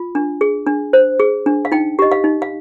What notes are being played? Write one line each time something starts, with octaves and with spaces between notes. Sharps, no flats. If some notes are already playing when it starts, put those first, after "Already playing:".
Already playing: F4
D4
G#4
D4
C5
G#4
D4
F5
D#4 G5
G4 D#5
F5
D#4
F5